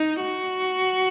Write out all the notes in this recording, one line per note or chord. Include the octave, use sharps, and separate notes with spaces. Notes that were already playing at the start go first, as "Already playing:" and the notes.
Already playing: D#4
F#4